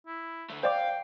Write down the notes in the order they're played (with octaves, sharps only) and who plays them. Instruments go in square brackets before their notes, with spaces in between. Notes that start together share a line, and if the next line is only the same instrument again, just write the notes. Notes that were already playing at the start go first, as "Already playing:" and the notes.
[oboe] E4
[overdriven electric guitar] D3 A3
[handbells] C5 D5 D6 [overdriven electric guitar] F5 [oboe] G5